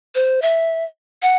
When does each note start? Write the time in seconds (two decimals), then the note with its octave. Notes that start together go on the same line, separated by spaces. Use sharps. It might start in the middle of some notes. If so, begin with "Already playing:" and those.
0.15 C5
0.42 E5
1.22 F#5